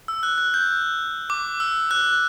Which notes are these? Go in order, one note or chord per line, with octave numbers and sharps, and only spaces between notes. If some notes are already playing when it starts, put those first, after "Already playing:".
E6
F#6
F#6
G6
D6
E6
F#6